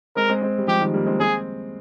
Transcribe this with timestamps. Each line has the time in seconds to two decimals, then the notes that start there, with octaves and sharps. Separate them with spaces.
0.16 G#3 C4 A#4
0.29 G#3 C4
0.42 G#3 C4
0.58 G3
0.67 F3 G#3 G4
0.81 D#3 G3
0.94 G3 A#3
1.06 G#3 C4
1.20 G#3 C4 G#4